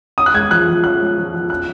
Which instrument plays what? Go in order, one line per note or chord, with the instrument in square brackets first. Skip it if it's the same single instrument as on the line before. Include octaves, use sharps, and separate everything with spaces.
[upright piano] C#4 [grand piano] D#6
[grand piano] F#6
[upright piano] G#3 [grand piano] G#6
[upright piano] F3 [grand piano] F#6
[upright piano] F3
[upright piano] C#4 [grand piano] F#6
[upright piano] G#3
F3
F3
[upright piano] C#4 [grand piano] F#6